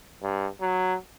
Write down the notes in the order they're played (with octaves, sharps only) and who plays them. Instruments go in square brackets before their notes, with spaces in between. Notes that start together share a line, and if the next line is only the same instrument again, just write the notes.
[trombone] G2
F#3